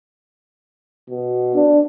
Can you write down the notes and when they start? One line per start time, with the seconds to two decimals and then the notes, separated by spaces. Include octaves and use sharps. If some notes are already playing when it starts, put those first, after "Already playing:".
1.09 B2
1.54 D4